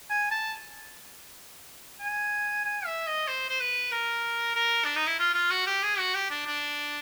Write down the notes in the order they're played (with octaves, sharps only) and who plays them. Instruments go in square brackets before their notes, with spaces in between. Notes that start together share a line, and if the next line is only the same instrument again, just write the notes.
[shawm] G#5
A5
G#5
G#5
E5
D#5
C5
C5
B4
A#4
A#4
D4
D#4
E4
F4
F4
F#4
G4
G#4
F#4
G4
D4
D4